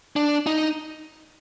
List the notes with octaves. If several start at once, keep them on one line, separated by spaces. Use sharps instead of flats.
D4
D#4